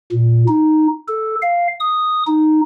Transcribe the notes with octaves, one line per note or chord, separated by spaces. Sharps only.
A#2
D#4
A4
F5
D#6
D#4